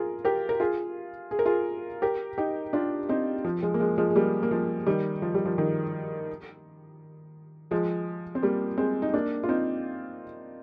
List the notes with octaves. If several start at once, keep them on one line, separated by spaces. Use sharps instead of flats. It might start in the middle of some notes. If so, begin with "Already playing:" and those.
Already playing: F4 G#4 A#4
G4 A#4
A#4
F4 G#4
G#4
A#4
F4 G#4
G4 A#4
D#4 G4
D4 F4
C4 D#4
F3
F3 G#3
A#3
F3 G#3
F3 G#3
G#3
G3 A#3
A#3
F3 G#3
D#3 G3
F3
G3
F3
D#3
F3 G#3
C4
G3 A#3
G#3 C4
D#4
A#3 D4
F4
C4 D#4